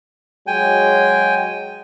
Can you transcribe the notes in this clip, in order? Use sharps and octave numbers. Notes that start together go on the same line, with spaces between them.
F#3 G#3 G5 G#5